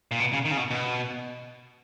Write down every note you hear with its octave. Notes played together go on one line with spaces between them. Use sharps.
A#2
B2
C#3
D#3
C#3
B2
B2